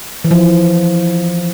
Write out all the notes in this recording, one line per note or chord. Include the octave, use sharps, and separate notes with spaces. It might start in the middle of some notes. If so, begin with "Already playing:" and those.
E3
F3